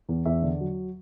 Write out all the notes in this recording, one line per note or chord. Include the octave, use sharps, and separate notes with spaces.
E2
E2 E5
D3
F#3